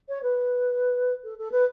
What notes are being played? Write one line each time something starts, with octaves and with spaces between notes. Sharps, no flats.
C#5
B4
A4
A4
B4